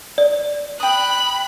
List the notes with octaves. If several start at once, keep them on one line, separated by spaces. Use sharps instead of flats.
D5
G5 B5 D#6 F#6